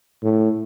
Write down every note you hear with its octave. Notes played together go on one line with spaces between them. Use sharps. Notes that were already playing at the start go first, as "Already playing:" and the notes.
A2